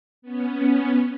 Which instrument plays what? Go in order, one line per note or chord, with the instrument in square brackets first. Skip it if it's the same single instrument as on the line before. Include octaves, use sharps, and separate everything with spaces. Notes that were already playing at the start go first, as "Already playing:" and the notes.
[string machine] B3 C#4